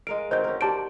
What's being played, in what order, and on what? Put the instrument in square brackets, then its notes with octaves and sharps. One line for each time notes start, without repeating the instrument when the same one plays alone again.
[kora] G#3 A#4 F5 [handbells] D7
[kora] D#3 C4 F#4 [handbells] C5 G6
[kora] C#4 A#4
[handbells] G4 A5 D7 [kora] C5 D5